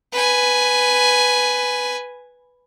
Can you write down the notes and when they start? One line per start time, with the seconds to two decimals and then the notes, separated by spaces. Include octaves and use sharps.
0.12 B4 G#5